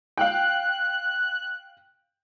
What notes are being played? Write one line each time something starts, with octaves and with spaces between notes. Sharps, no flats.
F5 G5 F#6